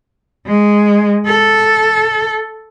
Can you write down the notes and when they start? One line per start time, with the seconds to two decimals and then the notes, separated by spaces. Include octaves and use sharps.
0.46 G#3
1.26 A4